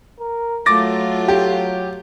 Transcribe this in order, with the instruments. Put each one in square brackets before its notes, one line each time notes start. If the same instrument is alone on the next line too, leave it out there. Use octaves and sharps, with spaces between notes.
[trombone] A#4
[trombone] F#3 [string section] A3 F4 [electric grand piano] D6 A6 A#6
[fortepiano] G4